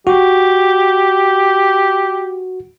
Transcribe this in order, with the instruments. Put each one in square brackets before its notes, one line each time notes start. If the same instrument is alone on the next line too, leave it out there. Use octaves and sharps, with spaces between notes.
[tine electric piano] F#4 [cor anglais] G4